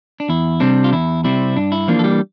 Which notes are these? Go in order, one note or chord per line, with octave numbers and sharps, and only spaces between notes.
D4
E2 E4
C3 G3 C4 D4
F4
E2 E4
C3 G3 C4 E4
G2 D4
E4
E3 F3 A#3 D4 F4
A4
G3 G4